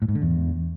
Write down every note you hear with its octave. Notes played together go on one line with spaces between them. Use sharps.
A2
G#2
D3
E2